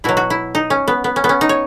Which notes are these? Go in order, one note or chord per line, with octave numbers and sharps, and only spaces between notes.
B2 F#3 E4
F#4
E4
D#4
C#4
B3
B3
C#4
B3
C#4
D#4
C#5